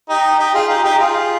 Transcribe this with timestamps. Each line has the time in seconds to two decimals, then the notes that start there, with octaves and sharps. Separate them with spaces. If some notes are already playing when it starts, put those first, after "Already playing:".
0.09 D#4 G4
0.39 D#4 G4
0.54 F4 G#4
0.68 D#4 G4
0.83 D#4 G4
0.98 F4 G#4